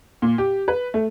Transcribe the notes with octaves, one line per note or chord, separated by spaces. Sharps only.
A#2
G4
B4
A3